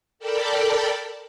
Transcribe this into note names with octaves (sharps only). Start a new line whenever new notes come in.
A4 A#4 D5 G5 A5 B5